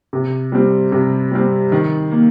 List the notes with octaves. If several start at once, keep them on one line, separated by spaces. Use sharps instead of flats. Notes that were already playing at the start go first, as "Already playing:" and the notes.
C3
G3 C4
C3
G3 C4
D#3
A#3